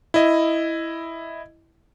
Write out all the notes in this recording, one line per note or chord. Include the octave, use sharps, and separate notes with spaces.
E4 D#5